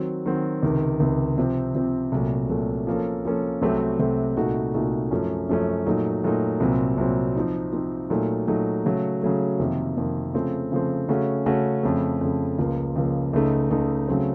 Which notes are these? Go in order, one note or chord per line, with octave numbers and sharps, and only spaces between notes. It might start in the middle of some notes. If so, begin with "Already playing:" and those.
Already playing: D#3 F#3 C4 F#4
D#3 F#3 C4 F#4
C#2 C3 D#3
C#2 C3 D#3
C3 F3 C4
C3 F3 C4
C2 A#2 F#3 A3
C2 A#2 F#3 A3
F3 A#3 C#4 A4
F3 A#3 C#4 A4
C2 C3 F#3 A3 C4
C2 C3 F#3 A3 C4
C2 A#2 A3 D#4 F#4
C2 A#2 A3 D#4 F#4
F#2 F3 A3 C#4
F#2 F3 A3 C#4
A#2 F#3 A3 D#4
A#2 F#3 A3 D#4
C2 A#2 F#3 C4
C2 A#2 F#3 C4
F3 C4 D#4
F3 C4 D#4
A#2 F#3 A3 D#4
A#2 F#3 A3 D#4
C#3 F#3 A3
C#3 F#3 A3
F2 C3 D#3 A#3
F2 C3 D#3 A#3
C#3 F3 A3 C4
C#3 F3 A3 C4
C#3 A3 C#4 F#4
C#3 A3 C#4 F#4
F2 C#3 A3
F2 C#3 A3
C#2 C#3 F3 A#3
C#2 C#3 F3 A#3
C#2 C#3 A3 D#4
C#2 C#3 A3 D#4
C#3 F#3 A3 C4